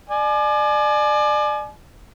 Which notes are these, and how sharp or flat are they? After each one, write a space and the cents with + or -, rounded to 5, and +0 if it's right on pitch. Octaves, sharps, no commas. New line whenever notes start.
D5 +30 G#5 +35